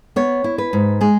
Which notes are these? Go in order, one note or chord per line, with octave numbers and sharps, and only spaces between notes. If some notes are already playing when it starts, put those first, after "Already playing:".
B3 C#5
E4
B4
G#2
G#3 G#4